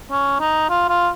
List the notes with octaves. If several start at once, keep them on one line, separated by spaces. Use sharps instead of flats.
C#4
D#4
F4
F4